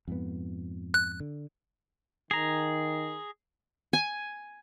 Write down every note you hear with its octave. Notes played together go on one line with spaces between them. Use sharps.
F2 G#2 B3
F#6
D3
D#3 G#4 A#5
G#5